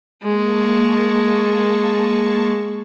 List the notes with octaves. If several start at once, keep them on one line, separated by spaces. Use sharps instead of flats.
G#3 A#3 A5 C#6